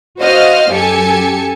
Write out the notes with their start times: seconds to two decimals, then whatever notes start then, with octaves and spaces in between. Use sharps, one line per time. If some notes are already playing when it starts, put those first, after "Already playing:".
0.20 F#4 C5 D#5 F5 F6
0.71 F#2 G4 A4 G#5 C#7